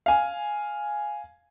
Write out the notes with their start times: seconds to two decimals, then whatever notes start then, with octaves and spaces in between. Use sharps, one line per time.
0.06 F5 G#5